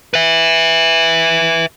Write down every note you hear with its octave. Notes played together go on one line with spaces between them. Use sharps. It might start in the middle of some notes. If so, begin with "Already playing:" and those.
B4 E5